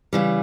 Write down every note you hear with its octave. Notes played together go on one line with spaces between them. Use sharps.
C#3 E3 G3